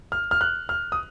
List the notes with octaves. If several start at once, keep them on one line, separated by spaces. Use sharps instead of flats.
F6
F6
F#6
F6
D#6